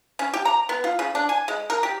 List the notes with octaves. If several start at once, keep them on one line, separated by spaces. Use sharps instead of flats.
C#4
G4
A#5
B3
F4
C#3
D4
G#5
G#3
A#4
G4